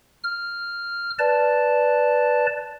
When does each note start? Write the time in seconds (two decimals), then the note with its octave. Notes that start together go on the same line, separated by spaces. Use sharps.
0.24 F6
1.19 B4 D5 A5